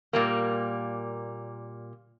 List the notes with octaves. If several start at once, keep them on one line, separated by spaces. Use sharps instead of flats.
A#2 G3 A#3